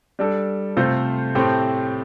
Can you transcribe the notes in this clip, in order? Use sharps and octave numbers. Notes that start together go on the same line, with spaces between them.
G3 D4 A4
C3 A3 F4 A4 C5
A2 A3 C4 G4 C5